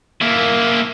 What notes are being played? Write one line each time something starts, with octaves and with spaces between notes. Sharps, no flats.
A#3 E4